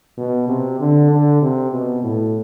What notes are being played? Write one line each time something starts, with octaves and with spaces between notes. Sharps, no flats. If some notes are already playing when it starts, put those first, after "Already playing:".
B2
C3
D3
D3
C3
B2
A2